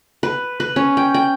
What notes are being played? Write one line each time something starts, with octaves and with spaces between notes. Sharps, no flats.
B4
B4
C#4
G5
G5